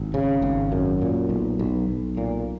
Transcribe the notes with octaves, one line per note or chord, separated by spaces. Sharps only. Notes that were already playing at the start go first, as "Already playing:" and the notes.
Already playing: G#1
C#3
G#1
F#2
A#2
B1
B1
B1
A#2